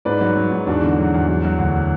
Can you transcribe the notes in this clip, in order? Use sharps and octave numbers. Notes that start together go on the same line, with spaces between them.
G#2 B4 D5
F#3
F#3
G#2
E2 D4 F#4
D3
F#3
E2
F#3
F#3
D2